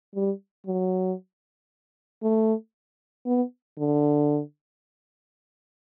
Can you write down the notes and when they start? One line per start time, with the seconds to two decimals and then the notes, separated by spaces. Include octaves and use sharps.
0.15 G3
0.66 F#3
2.22 A3
3.26 B3
3.78 D3